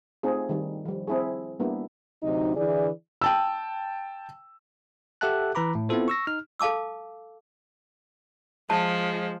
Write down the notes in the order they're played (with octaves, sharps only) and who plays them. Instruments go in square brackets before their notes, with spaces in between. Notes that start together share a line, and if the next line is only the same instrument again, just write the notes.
[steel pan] A3 C4 D#4 F4 G#4
D#3 G3
F3 G3
C4 E4 G#4
G3 A#3 B3 D4 E4
[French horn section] D2 C3 F#3 D#4
D3 E3 E4 G#4 D5
[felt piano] G5 A5 E6
[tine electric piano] G4 A4 E5 F#5 A5 F#6
E3 B4 A#5 B5 D6
A2
B3 C4 E4 F4 A4 C5
C#6 E6 A#6
D#4 F6
[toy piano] A4 F5 A5 D6 E6
[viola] F3 [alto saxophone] G#3 [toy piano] A5